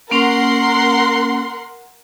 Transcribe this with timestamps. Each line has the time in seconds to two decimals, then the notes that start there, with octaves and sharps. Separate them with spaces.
0.11 A#3 C#4 A#4 F#5 C6